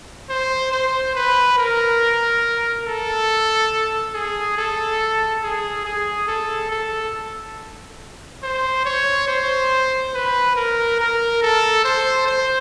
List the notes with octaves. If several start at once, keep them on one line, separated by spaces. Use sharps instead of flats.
C5
C5
B4
A#4
A4
G#4
A4
G#4
G#4
A4
A4
C5
C#5
C5
B4
A#4
A#4
A4
C5
C5